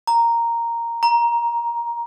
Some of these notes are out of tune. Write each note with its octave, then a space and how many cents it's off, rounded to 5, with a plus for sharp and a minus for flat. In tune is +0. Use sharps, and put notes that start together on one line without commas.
A#5 -5
A#5 +15